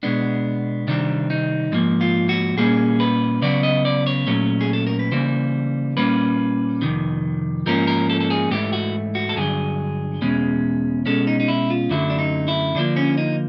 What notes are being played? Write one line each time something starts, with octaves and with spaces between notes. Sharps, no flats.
B2 G#3 B3 D4
C3 D#3 G3 C4 D4
D#4
G#2 F3 A#3
F4
F#4
A#2 G3 A#3 C#4 G#4
B4
C#3 F#3 B3 D5
D#5
D5
C#5
A#2 F#3 A3 C#4
G#4
A4
A#4
B4
C#3 E3 G3 A#3 C5
A#2 G3 A#3 C#4 B4
F2 C3 D#3
G#2 F3 A#3 C#4 A#4
A#4
A4
A4
G#4
G#2 E3 A3 G4
F#4
F#4
A4
G2 D3 F#3 G#4
E2 B2 G#3 C#4
B2 G#3 C#4 A4
D#4
D#4
E4
F4
F#2 D3 F#3 A3 E4
D4
D#4
E4
D3 F3 A#3 D4
C#4
D#4